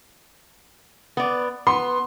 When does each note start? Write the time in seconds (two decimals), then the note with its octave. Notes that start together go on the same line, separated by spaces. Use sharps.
1.17 B3 D5
1.67 B3 C6